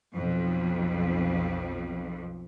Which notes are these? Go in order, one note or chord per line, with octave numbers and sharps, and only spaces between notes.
B1 F2